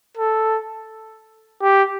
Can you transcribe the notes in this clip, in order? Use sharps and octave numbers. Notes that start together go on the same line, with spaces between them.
A4
G4